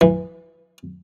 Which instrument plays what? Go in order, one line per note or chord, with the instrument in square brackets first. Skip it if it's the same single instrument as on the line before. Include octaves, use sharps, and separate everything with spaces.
[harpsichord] E3